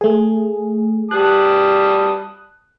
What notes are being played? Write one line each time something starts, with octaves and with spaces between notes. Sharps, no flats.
A3 G#4
G3 A5 D#6 F#6